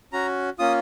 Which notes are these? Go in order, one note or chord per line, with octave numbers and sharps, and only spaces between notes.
C#4 F#4 A#5
A#3 C#4 F4 D#6